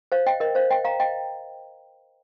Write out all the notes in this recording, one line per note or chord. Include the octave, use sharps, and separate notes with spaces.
C5 F5
D#5 G5
A#4 D#5
C5 F5
D#5 G5
F5 A#5
D#5 G5